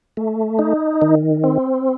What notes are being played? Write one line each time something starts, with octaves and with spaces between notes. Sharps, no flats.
A3
D#4
D#3
C4